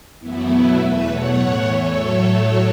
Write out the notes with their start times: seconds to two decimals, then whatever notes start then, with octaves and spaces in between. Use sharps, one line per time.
0.19 F#2 E3 A3 B3 E4
0.49 B2 F#3 A3
0.77 E2 E3 A3 B4 E5
1.07 E2 B2 F#3 A3 C#5 F#5
1.35 A2 E3 A3
1.64 E2 E3 A3 A4 C#5
1.94 A2 F#3 A3